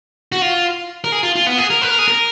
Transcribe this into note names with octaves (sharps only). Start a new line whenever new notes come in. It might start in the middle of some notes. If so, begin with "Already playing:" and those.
F#4
F4
A#4
G#4
F4
F4
B3
G#4
A#4
B4
A#4
G#4
A#4